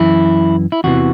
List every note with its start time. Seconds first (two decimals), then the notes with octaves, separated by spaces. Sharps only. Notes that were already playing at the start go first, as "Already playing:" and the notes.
Already playing: F#2 E3 E4
0.72 E4
0.84 E2 C3 E3 F#4